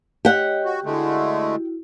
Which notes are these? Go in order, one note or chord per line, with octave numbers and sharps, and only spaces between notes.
G4 C#5 D#5 F#5
F#4
D3 G#3 A3 E4 F#4